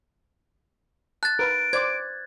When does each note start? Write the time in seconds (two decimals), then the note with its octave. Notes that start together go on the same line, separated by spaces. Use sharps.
1.23 A5 F#6 A6
1.39 A#4 B4 D7
1.73 C5 D5 D6 G#6